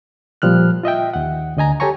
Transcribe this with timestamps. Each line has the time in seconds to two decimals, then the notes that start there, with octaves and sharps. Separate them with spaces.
0.42 A#2 F3 G3 F6 F#6
0.83 F4 D#5 E5 G5
1.14 D#2 F#5
1.57 D2 D3 D#5 G#5 A#5
1.80 G4 A4 C#5 G#5 A#5 C#6